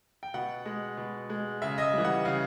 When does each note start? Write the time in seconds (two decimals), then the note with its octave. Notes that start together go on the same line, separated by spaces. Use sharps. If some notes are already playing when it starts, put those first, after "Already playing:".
0.23 G5
0.34 B2 F#5
0.65 G#3
0.97 B2
1.30 G#3
1.62 C#3 E5
1.78 D#5
1.82 E5
1.93 E3 G3
2.05 F#5
2.25 C#3 F5